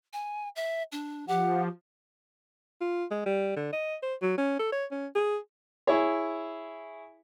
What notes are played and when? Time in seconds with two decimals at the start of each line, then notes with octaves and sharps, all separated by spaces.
0.13 G#5
0.56 E5
0.92 D4
1.28 F3 G4 F#5
2.81 F4
3.11 G#3
3.26 G3
3.56 D3
3.73 D#5
4.03 C5
4.22 F#3
4.38 C#4
4.59 A4
4.72 C#5
4.91 C#4
5.15 G#4
5.87 E4 G#4 C#5